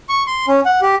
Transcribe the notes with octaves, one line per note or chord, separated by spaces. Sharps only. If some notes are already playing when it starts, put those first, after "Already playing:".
C#6
C6
C#4
F#5
G4